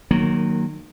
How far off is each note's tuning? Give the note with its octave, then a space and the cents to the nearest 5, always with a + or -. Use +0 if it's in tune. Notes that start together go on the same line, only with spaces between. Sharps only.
D#3 -25 F#3 -10 A#3 +0